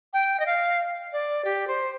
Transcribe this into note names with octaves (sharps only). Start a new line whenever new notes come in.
G5
D#5
F5
D5
G4
C5